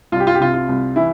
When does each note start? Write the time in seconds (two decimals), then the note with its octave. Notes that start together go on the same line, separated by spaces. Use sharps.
0.12 C2 F4
0.20 G4
0.27 F4
0.35 G4
0.40 C3 F4
0.54 F4
0.69 C2
0.96 E3 E4